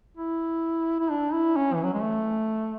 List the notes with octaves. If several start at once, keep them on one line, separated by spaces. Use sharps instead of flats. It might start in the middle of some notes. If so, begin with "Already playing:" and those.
E4
E4
D4
E4
C#4
E3
F#3
G#3
A3